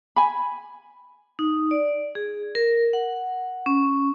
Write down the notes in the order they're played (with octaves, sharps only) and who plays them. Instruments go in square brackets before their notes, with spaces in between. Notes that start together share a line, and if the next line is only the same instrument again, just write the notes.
[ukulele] G#5 B5
[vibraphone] D#4
D5
G#4
A#4
F#5
C#4